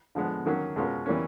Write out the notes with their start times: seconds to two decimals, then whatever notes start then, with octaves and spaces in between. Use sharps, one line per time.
0.15 D3 F3 G#3 B3
0.46 D#3 F#3 A#3 C#4
0.76 B2 G#3 C#4 F4 A#4
1.06 E3 G3 A#3 C#4